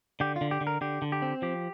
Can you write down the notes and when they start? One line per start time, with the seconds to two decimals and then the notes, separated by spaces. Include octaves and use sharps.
0.20 D3 G4
0.36 F4
0.41 D3
0.51 G4
0.61 D3
0.67 A#4
0.81 D3 G4
1.02 D3
1.12 G4
1.22 C4
1.42 F3 G4